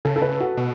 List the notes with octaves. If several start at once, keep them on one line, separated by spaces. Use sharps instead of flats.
C#3 A4
A4
B4
F#4
B2